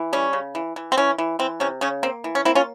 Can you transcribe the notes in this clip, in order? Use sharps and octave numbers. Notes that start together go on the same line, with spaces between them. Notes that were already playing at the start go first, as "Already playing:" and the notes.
Already playing: E3
G3 C#4
C#3
E3
E3
C4
E3 C#4
E3
E3 C4
C3 C#4
C#3 C#4
A#3 C4
E3
C#4
A#3 C4 E4
C#4 F4